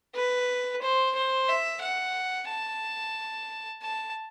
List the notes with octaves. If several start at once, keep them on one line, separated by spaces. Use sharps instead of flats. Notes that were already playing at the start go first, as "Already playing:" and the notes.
B4
C5
C5
E5
F#5
A5
A5